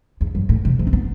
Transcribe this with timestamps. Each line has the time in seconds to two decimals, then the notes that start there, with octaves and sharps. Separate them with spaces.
0.21 E2
0.35 F#2
0.49 A2
0.65 C3
0.79 E3
0.87 C4
0.93 B3